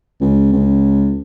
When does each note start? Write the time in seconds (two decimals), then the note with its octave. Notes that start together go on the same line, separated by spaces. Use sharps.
0.21 C#2
0.52 C#2